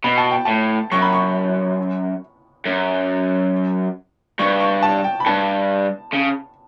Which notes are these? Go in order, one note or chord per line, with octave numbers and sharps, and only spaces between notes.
B2 B5
A5
G5
A2 A5
F#2 C#6
B5
C#6
F#2
G2 C#6
C#6
A5
G5
B5
G2 A5
C#3